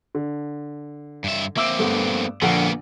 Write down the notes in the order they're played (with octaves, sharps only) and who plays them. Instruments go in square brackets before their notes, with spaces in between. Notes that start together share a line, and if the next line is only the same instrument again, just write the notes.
[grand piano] D3
[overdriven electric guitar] G2 E5
[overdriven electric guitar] A#3 C4 [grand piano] E5 D6 E6
[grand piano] G2 A3 B3
[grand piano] A#1 D3 F#5 [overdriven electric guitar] A#3 B3